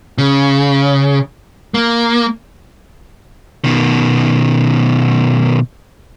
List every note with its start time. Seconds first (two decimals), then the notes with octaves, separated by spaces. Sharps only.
0.18 C#3
1.74 A#3
3.64 B2 D#3